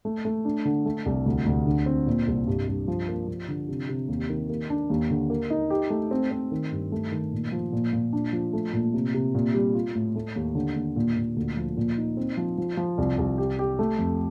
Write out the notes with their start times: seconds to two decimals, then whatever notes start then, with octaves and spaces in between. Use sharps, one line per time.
0.05 A3
0.25 A3
0.45 D4
0.65 D3
0.86 A3
1.06 C2
1.26 D2
1.46 D2
1.66 D3
1.86 C4
2.07 A#2
2.27 C2
2.47 G2
2.68 G2
2.88 F3
3.08 A#3
3.28 F3
3.48 D3
3.68 C3
3.89 C3
4.08 D#2
4.29 D#3
4.49 A#3
4.70 D4
4.90 D#2
5.10 D3
5.30 A#3
5.50 D#4
5.70 G4
5.90 A3
6.11 C4
6.31 C4
6.52 D#3
6.72 G2
6.92 A3
7.12 D#3
7.32 A#2
7.52 F3
7.73 A#2
7.93 A#2
8.13 D4
8.33 F3
8.53 A3
8.73 A#2
8.94 C3
9.14 C3
9.35 A#2
9.54 G3
9.74 F4
9.95 A2
10.16 A3
10.36 D#2
10.55 D3
10.76 D#2
10.96 A#2
11.16 A#2
11.36 D2
11.57 F3
11.77 A#2
11.98 D#4
12.17 C4
12.37 F3
12.58 F3
12.77 F3
12.98 C2
13.18 C2
13.38 G4
13.59 G4
13.79 A3
13.99 F2